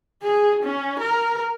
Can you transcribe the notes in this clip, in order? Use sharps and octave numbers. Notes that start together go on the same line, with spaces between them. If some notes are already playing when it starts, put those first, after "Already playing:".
G#4
C#4
A#4